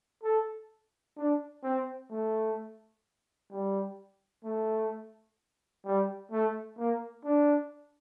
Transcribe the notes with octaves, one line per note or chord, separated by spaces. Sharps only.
A4
D4
C4
A3
G3
A3
G3
A3
A#3
D4